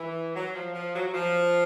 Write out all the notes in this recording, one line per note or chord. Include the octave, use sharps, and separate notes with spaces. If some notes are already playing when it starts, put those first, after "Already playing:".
Already playing: E3
F#3
F3
F3
F#3
F#3
F3